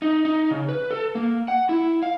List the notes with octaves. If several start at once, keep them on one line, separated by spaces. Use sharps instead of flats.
D#4
D#4
C#3
B4
A4
A#3
F#5
E4
F5